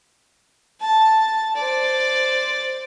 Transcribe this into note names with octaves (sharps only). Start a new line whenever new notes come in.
A5
C5 D5